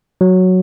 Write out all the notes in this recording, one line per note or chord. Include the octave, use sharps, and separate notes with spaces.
F#3